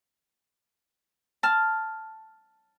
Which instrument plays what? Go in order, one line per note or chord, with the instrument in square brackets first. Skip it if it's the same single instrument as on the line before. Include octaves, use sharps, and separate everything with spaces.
[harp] A5 F6